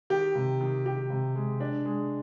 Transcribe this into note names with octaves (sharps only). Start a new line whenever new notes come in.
D#3 G4
C3
D#3
D#3 G4
C3
G#3
D4
G#3